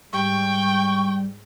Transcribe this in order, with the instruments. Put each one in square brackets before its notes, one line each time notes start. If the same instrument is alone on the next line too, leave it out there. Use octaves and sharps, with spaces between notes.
[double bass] G#2 [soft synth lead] G3 [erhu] G5 [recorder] C#6